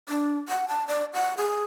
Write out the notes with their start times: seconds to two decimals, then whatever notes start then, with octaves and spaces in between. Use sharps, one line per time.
0.09 D4
0.49 F#5
0.68 A5
0.88 D5
1.14 F#5
1.38 G#4